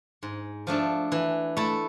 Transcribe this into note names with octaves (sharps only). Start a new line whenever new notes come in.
G#2
F3 A3 D4 A4
E3
A3 E4 A4